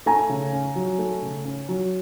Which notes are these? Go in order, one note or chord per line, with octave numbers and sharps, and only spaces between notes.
A3 G#5 A#5
C#3
C#4
F#3
A3
C#3
C#4
F#3